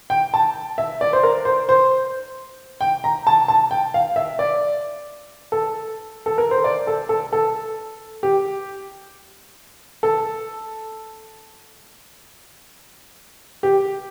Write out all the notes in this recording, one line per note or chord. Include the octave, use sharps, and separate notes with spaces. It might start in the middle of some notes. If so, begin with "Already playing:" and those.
G5
A5
E5
D5
C5
A#4
C5
C5
G5
A#5
A5
A5
G5
F5
E5
D5
A4
A4
A#4
C5
D5
A4
A4
A4
G4
A4
G4